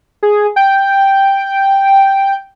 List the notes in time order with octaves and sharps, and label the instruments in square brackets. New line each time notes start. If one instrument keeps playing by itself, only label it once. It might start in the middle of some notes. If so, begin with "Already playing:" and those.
[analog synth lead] G#4
G5